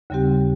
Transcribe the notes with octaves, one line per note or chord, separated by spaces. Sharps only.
D#2 C#3 G3 C4 G4